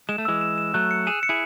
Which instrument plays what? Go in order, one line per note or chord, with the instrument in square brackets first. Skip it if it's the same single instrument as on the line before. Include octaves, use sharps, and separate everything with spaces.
[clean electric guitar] G#3 [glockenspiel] E7
[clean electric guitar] A3
[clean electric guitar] E3 G#3 [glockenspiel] E6
[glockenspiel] E7
E7
[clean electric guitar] F#3 A3 [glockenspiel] F#6
[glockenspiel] C#7
[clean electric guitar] G#4 [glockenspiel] E7
[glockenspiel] C#7
[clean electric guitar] E4 G#4